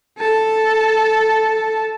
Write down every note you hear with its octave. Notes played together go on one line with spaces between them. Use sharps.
A4 A5